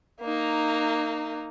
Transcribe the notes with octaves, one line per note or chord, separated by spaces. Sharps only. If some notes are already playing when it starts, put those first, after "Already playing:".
A#3 D#4